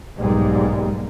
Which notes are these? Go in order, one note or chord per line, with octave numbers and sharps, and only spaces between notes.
B1 G#2 G3 G#3 A#3